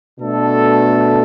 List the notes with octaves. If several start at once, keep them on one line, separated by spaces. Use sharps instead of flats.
B2 A3 D4 A4